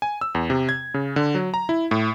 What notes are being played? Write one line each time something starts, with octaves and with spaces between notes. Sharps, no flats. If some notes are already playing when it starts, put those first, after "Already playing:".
G#5
E6
E2
C3
G#6
C#3
D3
F#3
A#5
E4
A2